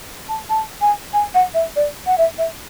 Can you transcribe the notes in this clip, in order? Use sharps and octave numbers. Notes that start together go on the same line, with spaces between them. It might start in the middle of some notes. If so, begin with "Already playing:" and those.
A5
A5
G#5
G#5
F#5
E5
D5
F#5
E5
E5